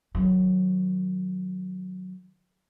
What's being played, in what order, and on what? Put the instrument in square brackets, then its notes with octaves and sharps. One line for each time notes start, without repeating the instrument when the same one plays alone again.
[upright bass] D#3 F#3